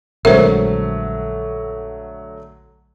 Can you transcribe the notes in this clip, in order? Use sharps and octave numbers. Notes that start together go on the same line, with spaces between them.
A#1 D3 F#3 G#3 A3 A#4 C5 E5